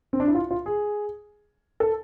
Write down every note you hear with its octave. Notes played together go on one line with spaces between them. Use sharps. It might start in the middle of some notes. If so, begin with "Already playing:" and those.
C4
D4
E4
F4
F4
G#4
A4